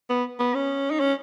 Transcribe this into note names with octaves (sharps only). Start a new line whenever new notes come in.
B3
B3
C#4
D#4
C#4